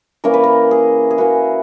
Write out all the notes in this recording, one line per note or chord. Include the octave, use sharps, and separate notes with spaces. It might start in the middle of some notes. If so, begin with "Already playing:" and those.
E3 A#3 C#4 E4 A#4
B4
A#4
G#4
G#4
E3 A#3 C#4 E4 F#4